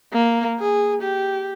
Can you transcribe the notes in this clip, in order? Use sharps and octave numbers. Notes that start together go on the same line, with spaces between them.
A#3
G#4
G4